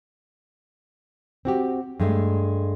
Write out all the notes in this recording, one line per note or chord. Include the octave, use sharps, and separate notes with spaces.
C4 F#4 G4
G2 G#3 A3